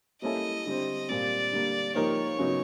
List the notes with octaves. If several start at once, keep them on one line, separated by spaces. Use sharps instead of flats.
G3 A#3 C#4 E4 A4 D#5
D3 G3 C4
A#2 G3 C4 D5
D3 G3 A#3
F3 A#3 D#4 G4 A#4 C#5
C#3 F#3 B3 D#4